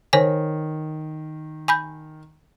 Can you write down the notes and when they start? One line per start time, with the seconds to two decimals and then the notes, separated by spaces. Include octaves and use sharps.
0.13 D#3 C5 C#5 G#5
1.68 G#5 B5 G6